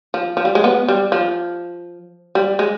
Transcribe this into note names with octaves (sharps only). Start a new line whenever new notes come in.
F3
F3
G3
G#3
B3
G3
F3
G3
G#3